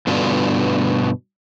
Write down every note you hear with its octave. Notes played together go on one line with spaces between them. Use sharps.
G2 B2 D3 F4